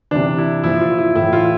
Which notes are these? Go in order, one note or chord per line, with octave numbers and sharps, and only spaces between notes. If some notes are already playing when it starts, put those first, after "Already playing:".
C3 E3 D4
E4
A#2 F3 E4
F4
E4
A2 E3 E4
F4